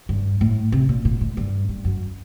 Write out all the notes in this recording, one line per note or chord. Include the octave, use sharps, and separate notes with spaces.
G2
A2
C3
A#2
A#2
A2
G2
G2
F#2